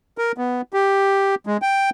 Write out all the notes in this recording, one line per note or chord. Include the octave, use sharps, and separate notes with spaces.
A#4
B3
G4
G#3
G5